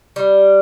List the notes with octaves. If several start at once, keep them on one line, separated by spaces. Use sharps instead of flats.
G3